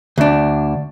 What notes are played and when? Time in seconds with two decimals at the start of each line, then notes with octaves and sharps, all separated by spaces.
0.18 D2 D4